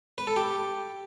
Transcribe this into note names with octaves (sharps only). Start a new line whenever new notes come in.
B4
A4
G4